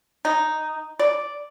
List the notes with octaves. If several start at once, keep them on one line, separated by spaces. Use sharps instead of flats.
D#4
D5